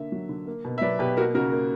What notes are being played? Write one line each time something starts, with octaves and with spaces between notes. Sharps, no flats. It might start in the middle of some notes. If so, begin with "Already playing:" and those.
Already playing: D3 A#3 E5
F#3
D3
A#3
B2
E5
F#3 B4 D5
B2 G4 B4
A#3 F#4 A#4
C#3 F#4 A#4
A#3